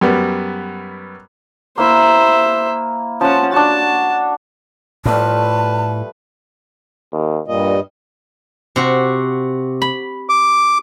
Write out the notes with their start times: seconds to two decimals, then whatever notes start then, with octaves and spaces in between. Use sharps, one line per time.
0.01 F#2 G3 B3
1.78 A#3 E4 C5 E5
3.21 F3 C#4 F#5 A5
3.52 D4 F#4 A5
5.06 A2 F3 G3 A3 B4 A5
7.12 D#2
7.48 G2 A#2 G3 D#5
8.76 C3 F#4
9.82 B5
10.29 D6